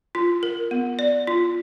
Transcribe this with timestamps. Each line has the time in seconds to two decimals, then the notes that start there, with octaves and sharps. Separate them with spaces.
0.15 F4
0.43 A#4
0.71 B3
0.99 D5
1.27 F4